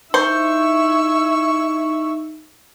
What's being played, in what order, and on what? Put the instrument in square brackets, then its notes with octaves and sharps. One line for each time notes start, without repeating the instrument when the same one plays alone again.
[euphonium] D#4 [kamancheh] E4 E6 [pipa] C5 [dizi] C#6